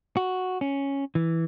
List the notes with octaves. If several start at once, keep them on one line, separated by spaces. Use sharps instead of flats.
F#4
C#4
E3